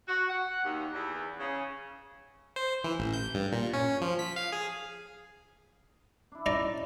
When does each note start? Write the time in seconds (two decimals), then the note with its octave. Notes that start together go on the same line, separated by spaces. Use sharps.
0.07 F#4
0.30 F#5
0.65 D#2
0.92 E2
1.39 C#3
2.56 C5
2.84 E3
2.99 A1
3.13 G6
3.34 G2
3.52 A#2
3.74 C#4
4.01 F3
4.19 B6
4.36 F5
4.52 G#4
6.32 D4 E4
6.46 C#4 D#4 D5 A#5